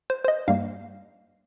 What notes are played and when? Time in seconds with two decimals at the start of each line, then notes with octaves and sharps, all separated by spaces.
0.10 C5
0.24 C5
0.28 D#5
0.48 G2 G3 A#3 F5